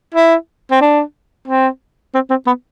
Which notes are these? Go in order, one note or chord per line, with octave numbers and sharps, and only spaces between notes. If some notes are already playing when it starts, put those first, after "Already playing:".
E4
C4
D4
C4
C4
C4
B3